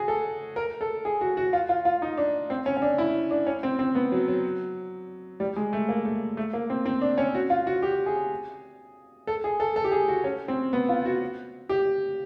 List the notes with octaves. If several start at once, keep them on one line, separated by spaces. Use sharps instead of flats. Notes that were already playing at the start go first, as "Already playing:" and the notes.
Already playing: F#4 G#4
A4
A#4
A4
G#4
F#4
F#4
F4
F4
F4
D#4
D4
C4
C#4
C#4
D4
E4
D4
C#4
C4
C4
B3
F#3
F#3
G3
G#3
A3
A#3
A3
A3
A#3
C4
C4
D4
C#4
F#4
F4
F#4
G4
G#4
A4
G#4
A4
A4
G4
G#4
F#4
C#4
C4
B3
F4
F#4
G4